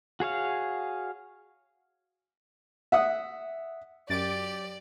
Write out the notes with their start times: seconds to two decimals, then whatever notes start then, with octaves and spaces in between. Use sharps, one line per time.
0.20 F#4 G#4 C#5 F5
2.92 E5 F#5 D#6
4.09 F#2 G4 D5 A6 D7